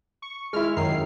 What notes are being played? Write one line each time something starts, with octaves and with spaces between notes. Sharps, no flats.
C#6
G#3 E4 F6
F#2 D#3 C7